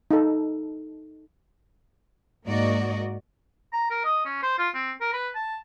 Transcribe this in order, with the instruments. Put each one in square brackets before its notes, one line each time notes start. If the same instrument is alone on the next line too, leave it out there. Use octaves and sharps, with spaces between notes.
[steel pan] D#4 A4
[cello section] G#2 A#3 F#4 D5 D#5
[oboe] A#5
A#4
D#5
C#4
C5
F4
C4
A#4
B4
A5